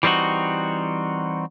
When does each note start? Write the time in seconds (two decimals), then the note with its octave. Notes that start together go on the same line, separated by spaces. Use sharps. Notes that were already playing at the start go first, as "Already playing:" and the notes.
0.03 E3 G3 C4 D#4 F#4